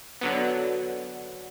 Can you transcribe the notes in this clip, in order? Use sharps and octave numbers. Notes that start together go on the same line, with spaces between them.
D3 F#3 B3